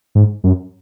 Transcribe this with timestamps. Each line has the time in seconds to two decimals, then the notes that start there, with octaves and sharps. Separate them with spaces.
0.15 G#2
0.44 F#2